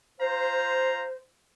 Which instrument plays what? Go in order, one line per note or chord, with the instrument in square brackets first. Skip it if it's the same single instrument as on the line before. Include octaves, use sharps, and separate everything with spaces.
[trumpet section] F4 F5 A#5 [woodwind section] C5